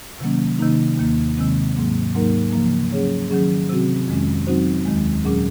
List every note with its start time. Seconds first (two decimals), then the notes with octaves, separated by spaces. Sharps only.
0.20 C3 D#3 F#3 A#3 C#4
0.59 C3 D#3 A#3 D#4
0.98 D#2 D#3 A#3
1.37 C3 D#3 G#3 C4
1.76 G#2 F#3 A#3
2.15 G#2 F#3 A#3 D#4 A#4
2.53 C#3 F3 A#3
2.92 F#3 C#4 G#4 C#5
3.30 D#3 F#3 C#4 G#4
3.69 C3 F#3 C4 F#4
4.08 F2 D#3 G#3 C#4
4.47 F#3 C4 D#4 F#4 C5
4.86 D#2 D#3 G#3
5.24 A#2 F#3 C#4 G#4